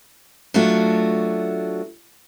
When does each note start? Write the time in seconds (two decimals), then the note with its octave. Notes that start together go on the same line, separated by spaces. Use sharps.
0.54 F#3 A3 D4 F4 F#4